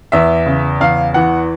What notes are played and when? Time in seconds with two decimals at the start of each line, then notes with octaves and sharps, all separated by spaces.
0.12 E2 E5
0.46 C#3
0.80 E2 F5
1.14 E3 F#5